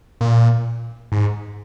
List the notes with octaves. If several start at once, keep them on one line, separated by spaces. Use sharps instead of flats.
A#2
G#2